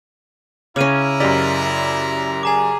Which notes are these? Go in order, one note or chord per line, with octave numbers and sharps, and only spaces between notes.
C#3 C#4 E4 A#5 D6 F6 D#7
F#2 G4 A#4 D5 D#5 B6
G#4 G#5 A#5 D6